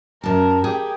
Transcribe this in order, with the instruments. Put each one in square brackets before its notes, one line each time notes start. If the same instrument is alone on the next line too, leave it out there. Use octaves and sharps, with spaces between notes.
[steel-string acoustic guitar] F#2 A5 [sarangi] A#4
[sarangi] G4 [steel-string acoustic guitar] G#4